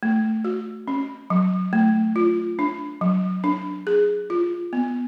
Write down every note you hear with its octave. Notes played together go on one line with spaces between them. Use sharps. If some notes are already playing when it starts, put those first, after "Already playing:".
A3
F#4
C#4
F#3
A3
F4
D4
F#3
D4
G#4
F4
B3